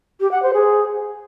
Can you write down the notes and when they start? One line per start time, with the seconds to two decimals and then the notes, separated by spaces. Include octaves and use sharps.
0.20 G4
0.31 F#5
0.42 C5
0.54 G#4